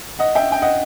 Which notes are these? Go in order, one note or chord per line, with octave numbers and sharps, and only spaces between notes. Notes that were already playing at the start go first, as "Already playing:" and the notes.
D#5 F#5
E5 G5
G5
D#5 F#5